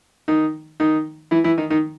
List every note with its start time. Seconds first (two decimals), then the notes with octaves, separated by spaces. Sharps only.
0.28 D#3 D#4
0.80 D#3 D#4
1.31 E3 E4
1.44 E3 E4
1.58 D#3 D#4
1.70 D#3 D#4